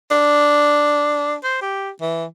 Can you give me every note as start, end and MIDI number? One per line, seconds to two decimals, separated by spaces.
0.11 1.35 62
1.44 1.61 72
1.62 1.90 67
2.01 2.25 52